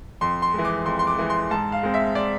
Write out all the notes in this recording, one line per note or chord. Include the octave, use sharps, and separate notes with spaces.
F2 C6
C6
E3 G#3
D6
F2 C6
C6
D6
E3 G#3
C6
G#2 A5
F5
G#3 C4
E5
D5